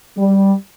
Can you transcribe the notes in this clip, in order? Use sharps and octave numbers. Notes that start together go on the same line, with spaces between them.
G3